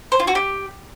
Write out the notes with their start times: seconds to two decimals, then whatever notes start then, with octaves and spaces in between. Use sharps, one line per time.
0.12 C5
0.20 F4
0.27 F#4
0.35 G4